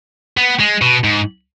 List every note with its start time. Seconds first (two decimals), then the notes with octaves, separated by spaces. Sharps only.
0.37 B3
0.60 G#3
0.82 B2
1.04 G#2